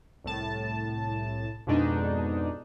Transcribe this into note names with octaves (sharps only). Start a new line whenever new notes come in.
C2 A2 A5
F2 G#2 B2 G#3 D4 D#4